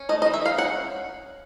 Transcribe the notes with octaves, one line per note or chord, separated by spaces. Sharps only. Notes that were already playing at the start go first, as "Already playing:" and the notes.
Already playing: C#4
A3 D#5
D#5
E3
E5
E3 F5
C#4 F#5